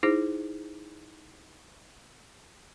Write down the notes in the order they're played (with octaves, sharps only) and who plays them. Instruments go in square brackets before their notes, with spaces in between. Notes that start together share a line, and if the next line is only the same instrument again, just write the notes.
[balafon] D#4 E4 G#4 C5